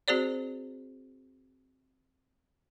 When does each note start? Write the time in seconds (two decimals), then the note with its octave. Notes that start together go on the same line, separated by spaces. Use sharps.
0.08 C4 F#4 G#4 C5 D5